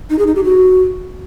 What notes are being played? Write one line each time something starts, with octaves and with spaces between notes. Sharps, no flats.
D#4
G#4
D#4
G4
F#4